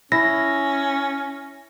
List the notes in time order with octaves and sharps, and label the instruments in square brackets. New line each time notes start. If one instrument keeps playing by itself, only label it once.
[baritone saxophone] C#4 [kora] E4 [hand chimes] A#6